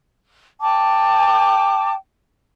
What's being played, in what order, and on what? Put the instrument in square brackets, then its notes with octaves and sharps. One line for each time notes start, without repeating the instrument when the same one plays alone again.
[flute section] G5 A5 D6